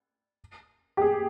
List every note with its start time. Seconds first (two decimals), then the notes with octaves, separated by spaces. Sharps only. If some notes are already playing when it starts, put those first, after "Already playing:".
0.97 G4
1.02 G#4